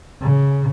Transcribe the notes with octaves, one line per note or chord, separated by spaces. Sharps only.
C#3